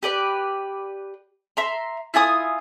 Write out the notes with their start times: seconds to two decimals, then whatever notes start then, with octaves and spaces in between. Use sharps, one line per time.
0.03 G4 B4 D5
1.57 E5 A#5 C6
2.14 E4 F4 G#5 D#6